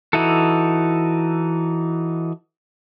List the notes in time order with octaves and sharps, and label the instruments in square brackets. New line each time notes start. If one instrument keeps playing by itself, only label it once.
[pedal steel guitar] E3 D#4 E4 F#4 A4